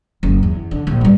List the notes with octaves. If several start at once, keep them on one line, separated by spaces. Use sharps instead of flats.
F#1
E2
D3
A#1
G#2 G3